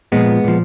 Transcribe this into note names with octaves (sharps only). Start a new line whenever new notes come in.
A#2 F3 G#3 B3
A#2 F3